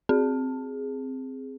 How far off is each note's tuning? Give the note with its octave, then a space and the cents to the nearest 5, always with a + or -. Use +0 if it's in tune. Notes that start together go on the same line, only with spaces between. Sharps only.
C4 +0 G#4 +0